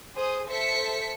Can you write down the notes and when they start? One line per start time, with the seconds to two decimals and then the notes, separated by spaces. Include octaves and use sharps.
0.15 G#4 C5 D#6
0.47 A4 C5 E5 B6 C#7